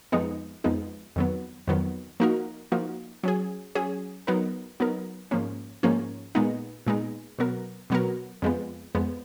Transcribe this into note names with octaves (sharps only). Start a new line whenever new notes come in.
F2 F3 G#3 B3 D#4
F2 F3 G#3 B3 D#4
F2 D#3 F#3 B3
F2 D#3 F#3 B3
F3 A#3 D#4 F#4 A#4
F3 A#3 D#4 F#4 A#4
F#3 C#4 G#4
F#3 C#4 G#4
F#3 B3 D#4 A#4
F#3 B3 D#4 A#4
G#2 F3 A#3 C#4
G#2 F3 A#3 C#4
A#2 G#3 B3 D#4
A#2 G#3 B3 D#4
B2 F#3 B3 F#4 A#4
B2 F#3 B3 F#4 A#4
F2 F3 G#3 B3
F2 F3 G#3 B3